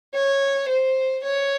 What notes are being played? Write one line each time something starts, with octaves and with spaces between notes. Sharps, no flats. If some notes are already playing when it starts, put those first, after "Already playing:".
C#5
C5
C#5